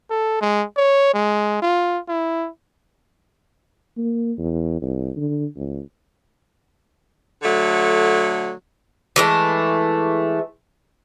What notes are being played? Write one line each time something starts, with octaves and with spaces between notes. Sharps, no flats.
A4
G#3
C#5
G#3
F4
E4
A#3
E2
C2
D3
C#2
D3 F#3 A3
E3 G#3 A3